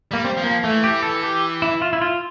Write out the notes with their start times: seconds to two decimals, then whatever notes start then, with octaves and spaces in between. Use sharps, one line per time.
0.11 G3 A#3
0.25 C4
0.37 F3
0.44 A#3
0.63 E3 A3
0.84 G4
1.03 A4
1.23 G4
1.62 E4
1.82 F4
1.93 E4
2.02 F4